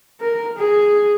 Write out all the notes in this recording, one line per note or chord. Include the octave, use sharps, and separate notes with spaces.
A#4
G#4